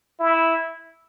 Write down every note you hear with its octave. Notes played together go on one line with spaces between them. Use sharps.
E4